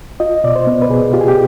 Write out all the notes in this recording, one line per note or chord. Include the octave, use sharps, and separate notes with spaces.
F4 D#5
B2 D5
C5
B3
B4
B2 G#4
F4 G4
G#4
G4